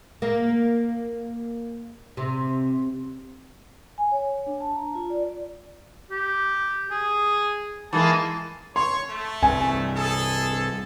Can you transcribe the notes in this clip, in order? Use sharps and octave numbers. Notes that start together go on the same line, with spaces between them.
A#3
C3
G#5
C#5
D4
A5
A#5
F4
D5
G4
G#4
E3 G#3 A#3 A5
C#5 C6
A3
C2 G2 C3 G#5
G#4 A4